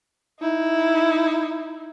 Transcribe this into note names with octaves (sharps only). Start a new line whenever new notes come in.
D#4 E4